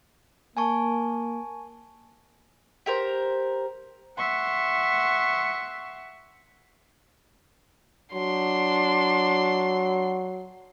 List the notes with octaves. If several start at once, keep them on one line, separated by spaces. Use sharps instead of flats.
A#3 G#5 A5 C#6
G4 A#4 C5
E5 F#5 C6 C#6
F#3 D4 C6